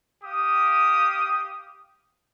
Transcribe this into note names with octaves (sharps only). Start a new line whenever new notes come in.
G4 F5 D#6